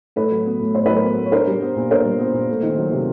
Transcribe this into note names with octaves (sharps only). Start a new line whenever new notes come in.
A2 A4 B4
F#3
B3
A2
A2 C5
F#3 B4
A#4 C5
B3
A2
C#5
D4 A#4 C5
G3
B3
A#2
D4 A#4 C5
G3
B3
A#2
A3
D#3
F#3
C3